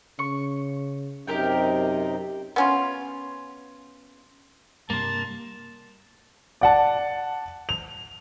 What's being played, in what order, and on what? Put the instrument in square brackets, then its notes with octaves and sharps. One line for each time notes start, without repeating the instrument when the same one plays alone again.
[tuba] C#3 [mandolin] C#6
[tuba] F#2 [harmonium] C3 D#4 [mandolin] G4 A#4 G5
[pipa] B3 C#4 F4
[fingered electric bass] G2 C3 [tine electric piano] G3 C6 [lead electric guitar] A#3 [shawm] A5
[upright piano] D5 F#5 A5
F7